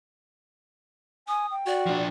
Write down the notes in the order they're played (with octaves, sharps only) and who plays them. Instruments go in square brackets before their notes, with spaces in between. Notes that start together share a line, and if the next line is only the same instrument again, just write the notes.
[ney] G#5 [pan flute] D#6
[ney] G5
[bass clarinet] F#4 [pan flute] D5
[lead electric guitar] F3 D4